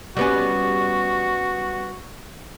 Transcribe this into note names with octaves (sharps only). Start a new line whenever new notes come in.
G3 B3 C#4 F#4